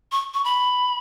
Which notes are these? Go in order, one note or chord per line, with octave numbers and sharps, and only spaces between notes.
C#6
C#6
B5